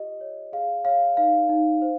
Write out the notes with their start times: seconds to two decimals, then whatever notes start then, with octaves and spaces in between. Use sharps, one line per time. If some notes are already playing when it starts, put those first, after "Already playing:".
Already playing: F4 G4 D#5
0.21 C#5
0.53 G#4 F5
0.85 C#5 F5
1.17 D#4 F5
1.49 D#4
1.82 C5